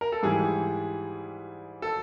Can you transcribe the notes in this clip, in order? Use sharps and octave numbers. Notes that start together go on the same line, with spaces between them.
A#4
A4
G#2 E3 G3 G#4
A4